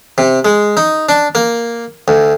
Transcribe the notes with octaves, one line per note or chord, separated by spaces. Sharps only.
C3
G#3
D#4
D4
A#3
D2